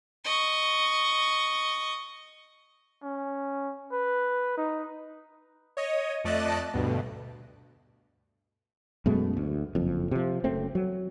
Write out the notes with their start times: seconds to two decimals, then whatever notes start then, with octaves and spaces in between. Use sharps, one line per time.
0.25 D#5 C#6
3.03 C#4
3.92 B4
4.57 D#4
5.77 C#5 D#5
6.24 F2 A3 D5 D#5 A5 F#6
6.74 D2 G2 B2
9.06 F#2 B2 G#3 A3
9.37 D2
9.75 F#1 F2
10.11 C3 F3
10.44 F#1 F#2 A3 C4
10.75 F#3